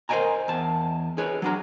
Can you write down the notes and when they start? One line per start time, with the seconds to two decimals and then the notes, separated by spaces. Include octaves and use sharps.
0.09 A#4 C5 D5 D#5 G#5 A#5
0.48 E2 A5
1.18 G#4 B4 C#5
1.42 F#3 D4 A#5